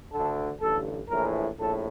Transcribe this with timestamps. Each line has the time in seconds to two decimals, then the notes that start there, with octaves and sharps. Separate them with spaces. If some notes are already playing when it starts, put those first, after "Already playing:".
0.12 D2 D3 A4
0.61 A1 G2 D3 A4
1.09 A#1 A2 E3 A#4
1.59 A#1 A2 A4